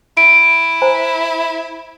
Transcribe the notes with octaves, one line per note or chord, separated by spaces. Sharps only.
E4 D7
C5 G#5 A#5